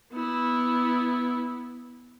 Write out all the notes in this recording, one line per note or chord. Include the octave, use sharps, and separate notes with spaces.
B3 E4